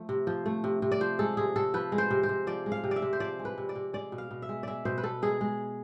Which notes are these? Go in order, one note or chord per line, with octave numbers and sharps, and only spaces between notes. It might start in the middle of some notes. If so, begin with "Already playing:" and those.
Already playing: F3 A3
C3
F3
A3
C3
C3
D5
F3 C5
G#3 A4
C3 G#4
C3 A4
F3 B4
G#3
C5
C3
C5
C3
F3 D5
G#3
F5
C3
D5
E5
C3
C5
F3 D5
G#3
B4
C3
D5
C3
G#3 D5
B2
F5
B2
E5
G#3
G#3 D5 E5
B2 C5
B4
B2 A4
G#3 G#4
G#3